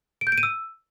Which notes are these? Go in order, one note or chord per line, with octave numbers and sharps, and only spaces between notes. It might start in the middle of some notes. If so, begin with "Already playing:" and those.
D7
G6
D7
D#7
E6